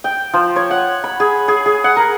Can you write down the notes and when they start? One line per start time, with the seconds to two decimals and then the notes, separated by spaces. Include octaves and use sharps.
0.04 G5
0.34 F3
0.56 C#5
0.71 F#5
1.04 B5
1.20 G#4
1.48 G#4
1.66 G#4
1.84 F#5
1.97 A#4